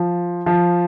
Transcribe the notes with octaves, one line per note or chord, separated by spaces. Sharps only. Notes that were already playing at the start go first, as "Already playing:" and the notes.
Already playing: F3
F3